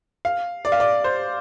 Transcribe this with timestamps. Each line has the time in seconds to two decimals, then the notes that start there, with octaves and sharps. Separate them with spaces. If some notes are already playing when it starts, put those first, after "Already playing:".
0.25 F5
0.65 D5
0.72 F5
0.80 D5
1.04 C5